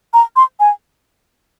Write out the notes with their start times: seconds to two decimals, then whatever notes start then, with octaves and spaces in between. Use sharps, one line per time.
0.14 A#5
0.36 C6
0.60 G#5